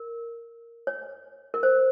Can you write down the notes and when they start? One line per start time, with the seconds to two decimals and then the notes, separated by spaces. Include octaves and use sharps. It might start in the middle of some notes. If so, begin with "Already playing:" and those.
Already playing: A#4
0.87 C#5
1.54 A#4
1.63 C5